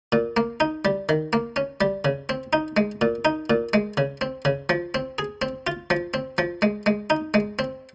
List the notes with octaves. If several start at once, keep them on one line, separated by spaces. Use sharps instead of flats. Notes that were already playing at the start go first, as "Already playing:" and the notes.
A#2
A#3
D#4
G3
D#3
A#3
C#4
G3
C#3
C4
D#4
G#3
A#2
D#4
A#2
G#3
C#3
C4
C#3
F3
C4
G#4
C4
F4
F3
C4
F3
G#3
G#3
D#4
G#3
C4